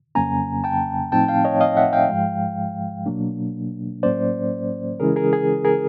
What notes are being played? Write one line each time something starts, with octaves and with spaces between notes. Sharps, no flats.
F2 C#3 F#3 A#3 C#4 G#5 A#5
G5 A5
A2 F3 A3 C4 D#4 G5 A5
F5 G5
C#5 D#5
D#5 F5
E5 F#5
F5 G5
G#2 F3 G#3
B2 F#3 A#3 D4
A2 F#3 A#3 C#4 C5 D5
C#3 E3 G#3 C#4 E4 G#4 A#4
G#4 A#4
G#4
G#4 A#4